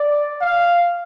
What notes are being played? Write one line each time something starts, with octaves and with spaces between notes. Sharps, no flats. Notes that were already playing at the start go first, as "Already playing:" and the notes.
Already playing: D5
F5